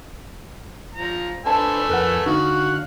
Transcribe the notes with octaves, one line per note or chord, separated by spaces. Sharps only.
F3 A#5
A3 D4 B4 C5 G#5 A5 E6
F2 A#4 B4 F#5
D3 D#4 F#4 F5 F#6